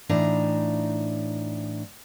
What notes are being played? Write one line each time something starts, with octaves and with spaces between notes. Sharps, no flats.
A2 E3 D4 D#4 A#5